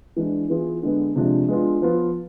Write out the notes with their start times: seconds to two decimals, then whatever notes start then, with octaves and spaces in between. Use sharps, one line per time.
0.17 E3 G#3 D4
0.50 E3 B3 F4 G#4
0.83 D3 G#3 B3
1.16 C3 F3 G#3 D4
1.49 G#3 B3 D4 F4
1.82 F3 B3 F4 B4